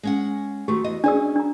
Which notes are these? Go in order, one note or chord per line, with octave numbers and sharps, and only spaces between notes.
G#3 C#4 F#5
D#3 A3 F#4 G4
E2 D#5
C#4 D4 G#4 D5 E6
D4 A#5